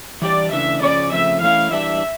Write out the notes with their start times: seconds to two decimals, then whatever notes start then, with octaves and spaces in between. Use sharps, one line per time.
0.22 E3 G3 D4 G4 D5
0.51 C#3 E3 A3 D4 E5
0.81 C#3 F3 C#4 D5
1.12 F2 C#3 F3 A3 E5
1.41 E3 A3 C#4 E4 F5
1.71 E3 G3 D4 E5